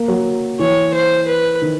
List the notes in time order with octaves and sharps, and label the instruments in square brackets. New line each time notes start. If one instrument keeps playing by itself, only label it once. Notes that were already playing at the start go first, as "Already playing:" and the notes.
Already playing: [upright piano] A#3
F#3
[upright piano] E3 [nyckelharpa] C#5
[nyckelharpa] C5
B4
[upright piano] D#3